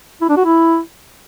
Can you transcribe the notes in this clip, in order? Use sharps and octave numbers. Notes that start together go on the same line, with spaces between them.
E4
D4
F#4
E4